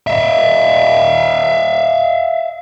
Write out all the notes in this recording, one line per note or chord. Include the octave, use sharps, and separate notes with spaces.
E5 F5